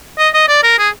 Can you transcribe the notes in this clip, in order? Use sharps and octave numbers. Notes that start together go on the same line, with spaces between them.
D#5
D#5
D5
A#4
G#4